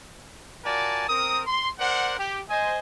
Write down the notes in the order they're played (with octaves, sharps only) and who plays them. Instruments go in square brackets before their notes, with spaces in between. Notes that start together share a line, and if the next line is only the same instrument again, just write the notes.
[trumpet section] F4 F#4 A#4 D5 G#5 A5
C4 A#4 D#6
C6
A#4 C5 D5 F#5
G4
C5 D#5 G#5